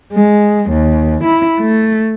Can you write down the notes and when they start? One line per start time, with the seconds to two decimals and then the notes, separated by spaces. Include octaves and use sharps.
0.13 G#3
0.70 D#2
1.24 E4
1.60 A3